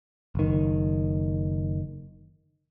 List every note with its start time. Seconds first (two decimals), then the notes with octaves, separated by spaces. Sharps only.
0.35 F#1 D#3